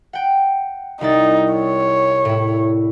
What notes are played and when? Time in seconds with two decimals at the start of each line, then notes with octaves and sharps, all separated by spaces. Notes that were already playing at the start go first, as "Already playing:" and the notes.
0.13 F#5 G5
1.01 C2 D#4 E4 A6
1.53 C#5
2.25 A2 E4